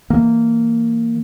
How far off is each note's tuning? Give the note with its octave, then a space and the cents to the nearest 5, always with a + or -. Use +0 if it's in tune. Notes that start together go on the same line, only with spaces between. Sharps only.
E3 -5 A#3 -15